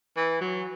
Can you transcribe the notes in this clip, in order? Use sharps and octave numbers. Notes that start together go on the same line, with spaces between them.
E3
F#3